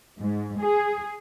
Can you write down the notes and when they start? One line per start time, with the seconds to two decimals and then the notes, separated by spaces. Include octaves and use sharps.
0.19 G#2
0.60 G#4